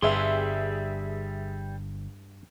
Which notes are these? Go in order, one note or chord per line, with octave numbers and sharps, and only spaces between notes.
G1 G2 G3 G#4 B4 E5 F5 C6